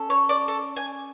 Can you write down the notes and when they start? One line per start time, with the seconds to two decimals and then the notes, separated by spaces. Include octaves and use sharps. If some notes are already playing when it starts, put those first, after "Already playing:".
Already playing: C#4 A4
0.10 C#5
0.29 D5
0.48 A4
0.77 G#5